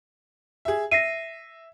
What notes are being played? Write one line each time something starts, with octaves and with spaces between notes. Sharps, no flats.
G#4 E5
E5 A#6 C7 D#7